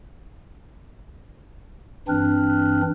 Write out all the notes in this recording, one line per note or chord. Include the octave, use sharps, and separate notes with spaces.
G2 E3 C4 D4 F6 F#6